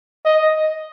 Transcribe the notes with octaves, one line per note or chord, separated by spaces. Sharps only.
D#5